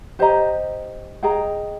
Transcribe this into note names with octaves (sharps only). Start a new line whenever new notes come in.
G4 C5 D#5 A#5
G#4 D#5 G5 A#5